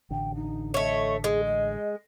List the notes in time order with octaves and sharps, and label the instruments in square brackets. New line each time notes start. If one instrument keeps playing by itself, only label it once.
[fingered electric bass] A1 D3 [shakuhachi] G5
[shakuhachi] D#4
[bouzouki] A3 C#5 [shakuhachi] D#5
[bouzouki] G#3 [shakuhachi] G#4
[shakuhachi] D#5